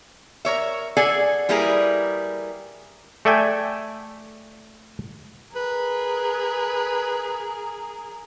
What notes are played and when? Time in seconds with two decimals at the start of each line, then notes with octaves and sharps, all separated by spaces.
0.45 A#4 C#5 E5
0.97 G#4 A4 D5 F#5 G#5
1.49 G3 A#3 E4 G#4 A#4 B4
3.25 A3 A4 D5 E5 G5 G#5
5.56 G#4 A#4 B4